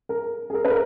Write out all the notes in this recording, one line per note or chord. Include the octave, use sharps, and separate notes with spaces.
A#4
G#4
A#4
B4
A#4